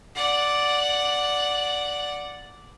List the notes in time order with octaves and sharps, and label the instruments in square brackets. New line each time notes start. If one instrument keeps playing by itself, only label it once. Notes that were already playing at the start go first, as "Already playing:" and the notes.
[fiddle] D5 F#5